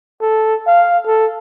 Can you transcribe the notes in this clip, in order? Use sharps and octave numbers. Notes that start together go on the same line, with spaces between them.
A4
F5
A4